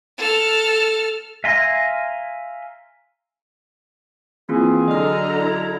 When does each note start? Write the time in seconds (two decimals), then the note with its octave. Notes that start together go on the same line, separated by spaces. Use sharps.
0.18 A4 F6
1.44 E5 F5 G#5 A#5 C6
4.49 E3 A#3 C4 F4 G#4
4.88 D3 F#3 A4 D#5 A#5 F6
5.38 E4